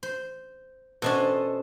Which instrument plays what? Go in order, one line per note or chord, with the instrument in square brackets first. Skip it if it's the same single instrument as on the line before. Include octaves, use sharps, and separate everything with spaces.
[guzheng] C5
[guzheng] B2 C#4 D4 [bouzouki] A4 C5 D#5